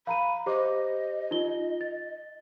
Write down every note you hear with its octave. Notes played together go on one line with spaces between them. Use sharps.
F5 A#5 B5 D#7
G4 C5 D#5 D6
D#4 F4 G7
A6